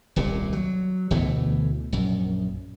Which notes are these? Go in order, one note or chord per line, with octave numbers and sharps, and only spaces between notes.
D#1 C2 A#2
F#3
D2 B2 E3 A3
A#1 F#2